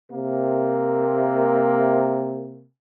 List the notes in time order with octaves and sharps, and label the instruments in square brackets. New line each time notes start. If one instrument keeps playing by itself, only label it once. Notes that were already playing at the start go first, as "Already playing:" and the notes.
[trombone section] C3 A#3